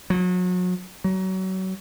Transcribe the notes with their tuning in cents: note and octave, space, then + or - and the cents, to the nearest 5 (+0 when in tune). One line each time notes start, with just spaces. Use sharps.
F#3 -35
F#3 +30